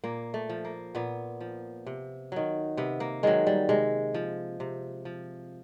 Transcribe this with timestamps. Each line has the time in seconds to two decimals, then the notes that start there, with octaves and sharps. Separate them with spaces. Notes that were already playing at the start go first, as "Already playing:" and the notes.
0.04 A#2 A#3
0.34 A3
0.49 F3
0.65 A#3
0.95 A#2 B3
1.41 F3
1.87 C3
2.32 D#3 F#3
2.77 C3 B3
3.00 A#3
3.23 D#3 F#3 G#3
3.47 G3
3.69 C3 G#3
4.14 F3
4.60 C3
5.05 F3